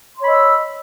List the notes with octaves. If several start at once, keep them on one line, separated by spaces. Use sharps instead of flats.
C#5 D#5 B5 C6 E6